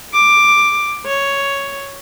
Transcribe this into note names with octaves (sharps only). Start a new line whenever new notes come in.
D6
C#5